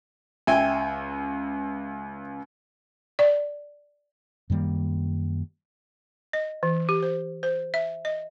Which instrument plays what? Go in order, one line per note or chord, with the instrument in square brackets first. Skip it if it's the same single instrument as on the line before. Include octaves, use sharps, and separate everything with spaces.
[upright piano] C#2 [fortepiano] E5 G5 G#5
[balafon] D5
[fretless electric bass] F#2 D#3 G3 A#3
[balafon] D#5
E3
G4
C5
C5
E5
D#5